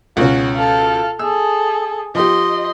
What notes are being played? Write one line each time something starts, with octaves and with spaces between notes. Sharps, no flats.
C#2 B2 C#4 F#4
A4 F5
G#4 A4 E6
F3 G4 D#5 C6